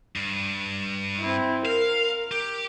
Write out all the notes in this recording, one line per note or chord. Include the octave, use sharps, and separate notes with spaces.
G2
C4 E4
A#4 F5
G4